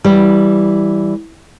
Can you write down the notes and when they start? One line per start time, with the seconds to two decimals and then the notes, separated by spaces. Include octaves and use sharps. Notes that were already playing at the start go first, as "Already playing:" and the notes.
0.04 E3 G3